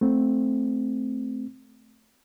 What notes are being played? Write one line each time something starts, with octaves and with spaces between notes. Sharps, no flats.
A3 C4